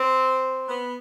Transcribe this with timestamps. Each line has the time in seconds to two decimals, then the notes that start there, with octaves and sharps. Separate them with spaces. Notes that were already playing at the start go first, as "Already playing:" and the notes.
Already playing: C4
0.69 B3